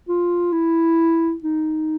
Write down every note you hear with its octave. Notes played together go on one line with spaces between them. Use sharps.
F4
E4
D#4